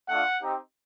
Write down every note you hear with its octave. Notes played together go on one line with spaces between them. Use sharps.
A3 D4 F4 F#5
C4 D#4 G4